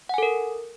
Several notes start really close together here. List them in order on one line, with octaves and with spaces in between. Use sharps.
F#5 G#5 A4 A#4